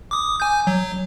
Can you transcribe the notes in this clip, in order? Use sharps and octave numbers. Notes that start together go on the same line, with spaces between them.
D6 D#6
G#5 G6
F#3